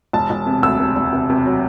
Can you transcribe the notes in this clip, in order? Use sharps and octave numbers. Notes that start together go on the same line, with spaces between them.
E1 A5
E1
C3
D2 E6
C3
E1
C3
C3
F#3